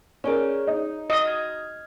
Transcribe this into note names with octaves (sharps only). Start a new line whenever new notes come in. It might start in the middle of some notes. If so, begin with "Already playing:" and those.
C#4 G#4 A#4 C#5 D5
D#4
F#4 D#5 D#6
F6 G#6